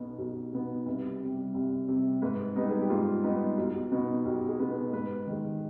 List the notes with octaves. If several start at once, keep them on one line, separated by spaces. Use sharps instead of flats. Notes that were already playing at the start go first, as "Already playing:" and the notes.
Already playing: B1 B2 B3 D#4
B1
B2 B3 D#4
C2 B4
C3 G3
C2
C3 G3
G#2 B4
G3 B3 D#4 B4
G#4
G4
G#2 F4
G3 B3 D#4
B1
B2 B3 D#4
B1 G4
G#4
B2 B3 D#4
B4
G#2 B4
D#3 G#3